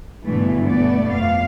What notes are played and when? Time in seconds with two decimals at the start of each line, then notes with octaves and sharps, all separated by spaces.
0.23 G2 B2 D3 E3 G3 A3
0.67 A3 B3 D5
1.09 F2 F5